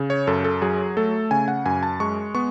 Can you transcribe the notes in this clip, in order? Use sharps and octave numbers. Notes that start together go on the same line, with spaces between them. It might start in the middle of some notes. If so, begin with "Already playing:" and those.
Already playing: C#3
C#5
F#2 A4
A4
F#3 G#4
A3 A4
C#3 G#5
F#5
F#2 G#5
A5
G#3 C#6
B3 C#6